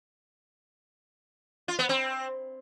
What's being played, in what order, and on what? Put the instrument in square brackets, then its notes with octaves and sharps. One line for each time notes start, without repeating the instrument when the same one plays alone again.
[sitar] F4
B3
C4